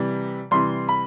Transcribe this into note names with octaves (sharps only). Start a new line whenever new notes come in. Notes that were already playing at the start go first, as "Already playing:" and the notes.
Already playing: C3 E3 G3
C3 E3 G3 C6
B5